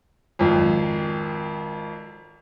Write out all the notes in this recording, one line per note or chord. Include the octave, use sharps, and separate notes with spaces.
G#1 F2